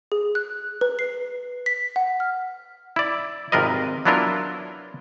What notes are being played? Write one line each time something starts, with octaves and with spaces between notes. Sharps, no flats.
G#4
F#6
B4
C7
B6
F#5
F6
E4 D5
G#1 C3 F4 A#4 B4 D#5
F#3 B3 D4 E4 F4 A#4